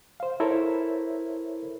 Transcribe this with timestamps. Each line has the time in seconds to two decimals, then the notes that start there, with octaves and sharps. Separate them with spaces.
0.20 C5 F5
0.40 E4 A4 A#4 C5 C#5 E5